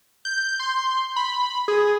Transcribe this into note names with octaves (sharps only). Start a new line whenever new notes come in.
G6
C6
B5
G#4